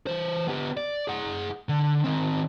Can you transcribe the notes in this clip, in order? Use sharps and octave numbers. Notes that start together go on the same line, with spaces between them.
E3 C5
B3 G4
D5
G#4 F#5
D3
D#3 C4